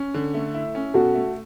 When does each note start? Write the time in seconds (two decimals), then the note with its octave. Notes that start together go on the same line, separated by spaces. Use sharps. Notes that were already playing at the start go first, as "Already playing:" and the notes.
Already playing: C#4
0.14 D3
0.34 A3
0.54 E4
0.75 C#4
0.94 B2 F#4 A4
1.15 A3